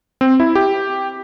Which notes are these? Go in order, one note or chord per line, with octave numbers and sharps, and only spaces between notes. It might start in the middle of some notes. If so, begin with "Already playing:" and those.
C4
E4
G4